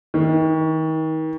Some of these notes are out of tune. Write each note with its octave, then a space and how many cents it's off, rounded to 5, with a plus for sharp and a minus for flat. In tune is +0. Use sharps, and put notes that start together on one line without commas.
D#3 +35